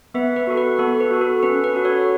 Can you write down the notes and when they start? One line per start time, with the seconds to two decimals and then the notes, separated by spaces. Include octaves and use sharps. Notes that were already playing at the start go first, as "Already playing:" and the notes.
0.14 B3 B4 E5
0.36 B4
0.47 F#4 A4
0.57 B4
0.79 B3 A4
1.00 B4
1.11 F#4 A4
1.21 A4
1.43 C#4 B4
1.64 B4
1.75 F#4 A4
1.85 A4 C#5